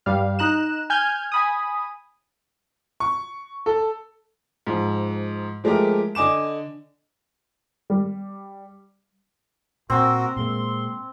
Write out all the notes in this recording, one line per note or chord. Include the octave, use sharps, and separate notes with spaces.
G2 G3 F5
D#4 A#5 F#6 E7
G#5 F6 G6 G#6
G#5 B5 D#6
C#6
A4
G#2 F3
F3 G#3 A3 G4 A#4
D3 D#5 G#5 D6 E7
G3
A#2 C4 F#4 A#4
A#2 G#3 A#3 C6